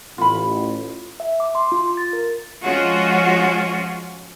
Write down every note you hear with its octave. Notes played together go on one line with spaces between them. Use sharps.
A1 F4 B5
E5
D6
C6
F4
A6
A#4
F3 G#3 C#4 F4 F#4